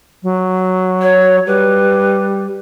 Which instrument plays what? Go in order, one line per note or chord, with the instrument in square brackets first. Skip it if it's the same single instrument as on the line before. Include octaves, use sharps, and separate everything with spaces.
[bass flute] F#3
[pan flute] C#5
[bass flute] G3 [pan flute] B4